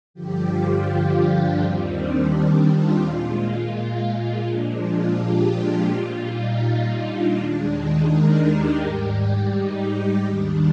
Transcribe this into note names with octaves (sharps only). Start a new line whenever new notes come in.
G2 D3 F3 G4
F4
D4
D#2 D#3 G3 C4
D4
F4
A#2 G#3
F4
A#2 F3 G#3 D4
F4
G4
F4
A#2 G3
D#4
F4
D4
D#2 D#3 G#3 D4
D#4
A#4
G4
G#2 G3
D#4
D#2 D#3 G3 D4